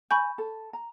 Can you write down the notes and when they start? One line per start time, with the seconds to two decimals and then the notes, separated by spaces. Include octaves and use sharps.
0.11 G#5 B5 C#6 G6
0.38 A4
0.73 A#5